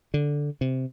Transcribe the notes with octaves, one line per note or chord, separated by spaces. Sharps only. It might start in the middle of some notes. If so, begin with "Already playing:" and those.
D3
C3